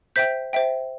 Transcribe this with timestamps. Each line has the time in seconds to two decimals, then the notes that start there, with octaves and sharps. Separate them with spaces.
0.16 C5 E5 G5 G6 B6
0.53 C5 E5 G5